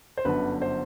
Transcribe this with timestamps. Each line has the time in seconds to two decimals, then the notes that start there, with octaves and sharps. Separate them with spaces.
0.17 C5
0.25 G1 F#2 D3 B4
0.62 C5